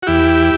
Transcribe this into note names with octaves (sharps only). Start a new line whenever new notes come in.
F#4
E2 E4 G4